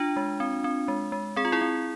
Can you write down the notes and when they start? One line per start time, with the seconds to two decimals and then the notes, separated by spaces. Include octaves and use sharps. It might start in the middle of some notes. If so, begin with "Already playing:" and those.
Already playing: D4 F4
0.16 G#3
0.40 C4
0.64 C4
0.88 G#3
1.12 G#3
1.36 C4 G#4
1.45 F4
1.52 E4 G#4
1.61 C4